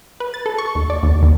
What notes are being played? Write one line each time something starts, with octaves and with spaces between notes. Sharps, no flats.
B4
A6
A4
C#6
D#2
D5
D#2
D#2